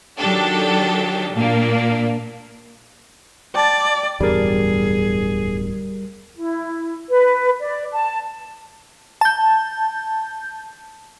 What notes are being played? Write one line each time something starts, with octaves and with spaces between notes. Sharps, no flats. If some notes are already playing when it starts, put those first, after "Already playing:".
D#3 F#3 D4 G4 A4
A#2 A#3 D4
D5 G5 A5 A6
D1 E2 G2 G3 G#4 A#4
E4
B4
D5
A5
A5 G6